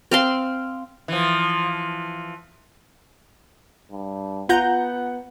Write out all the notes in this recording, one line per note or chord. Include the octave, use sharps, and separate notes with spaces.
C4 F5 C6
E3 F3
G2
B3 F4 F#5 A#5 G6